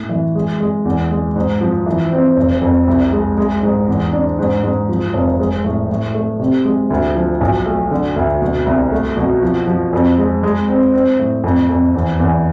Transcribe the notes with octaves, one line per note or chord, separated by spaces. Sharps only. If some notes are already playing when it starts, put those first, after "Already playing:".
Already playing: A2
E3
G#3
G#3
E2
G#3
G#2
F3
E3
C4
F1
F2
C2
G#3
G#3
G#2
E2
D4
G#2
G#2
F3
F1
G#3
A2
A2
A3
C3
G#3
D2
F3
B1
A3
D3
D2
B2
C2
A3
B2
F3
F3
F2
G#3
G#3
C4
C4
A2
F2
F2
E2
E2